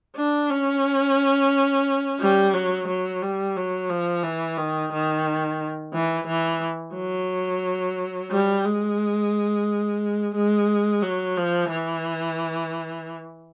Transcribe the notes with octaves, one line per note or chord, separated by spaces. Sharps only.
D4
C#4
G3
F#3
F#3
G3
F#3
F3
E3
D#3
D#3
E3
E3
F#3
G3
G#3
G#3
F#3
F3
E3